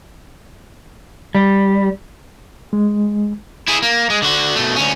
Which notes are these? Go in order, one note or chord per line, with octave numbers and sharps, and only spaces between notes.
G3
G#3
E4 G#4
A#3
G#3
D3 F#4
B2 A3
D2 C#4